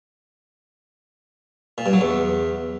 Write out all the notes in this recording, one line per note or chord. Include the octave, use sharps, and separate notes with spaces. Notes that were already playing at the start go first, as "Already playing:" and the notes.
A#2
G2
F#3
E2